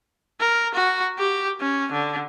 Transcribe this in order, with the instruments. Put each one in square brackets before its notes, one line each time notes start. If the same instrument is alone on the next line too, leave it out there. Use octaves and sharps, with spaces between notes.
[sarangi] A#4
F#4
G4
C#4
D3